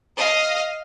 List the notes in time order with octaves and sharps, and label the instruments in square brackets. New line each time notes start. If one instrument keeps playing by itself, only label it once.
[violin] D#5 F5